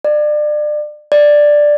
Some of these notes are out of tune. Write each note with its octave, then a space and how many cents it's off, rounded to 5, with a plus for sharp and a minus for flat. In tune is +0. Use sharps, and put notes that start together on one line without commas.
D5 +30
D5 +5